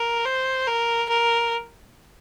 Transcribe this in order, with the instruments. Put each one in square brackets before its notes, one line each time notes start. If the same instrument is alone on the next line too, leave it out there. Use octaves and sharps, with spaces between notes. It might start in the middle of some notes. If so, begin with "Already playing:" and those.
Already playing: [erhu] A#4
C5
A#4
A#4